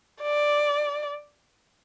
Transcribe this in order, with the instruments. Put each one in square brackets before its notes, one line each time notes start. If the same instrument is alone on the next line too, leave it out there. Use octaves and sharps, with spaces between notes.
[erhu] D5